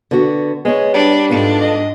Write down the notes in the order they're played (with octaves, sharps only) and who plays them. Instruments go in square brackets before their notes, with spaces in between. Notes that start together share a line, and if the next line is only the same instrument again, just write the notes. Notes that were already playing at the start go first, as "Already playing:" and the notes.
[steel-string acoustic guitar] D3 B3 F#4
[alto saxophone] G#3 [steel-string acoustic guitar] B3 C#5
[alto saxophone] G3 [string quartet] D4
[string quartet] G#2 D4 [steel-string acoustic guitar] B3 F4 A4
[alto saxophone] D#5